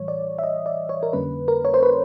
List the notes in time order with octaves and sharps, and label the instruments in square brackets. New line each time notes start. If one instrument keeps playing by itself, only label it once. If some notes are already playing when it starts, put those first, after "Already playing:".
Already playing: [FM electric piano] A2 E3 G3 C#5
D5
E5
D#5
D5
C#5
A#4
F2 D3 G3 A#3 C#4 B4
A#4
C#5
C5
B4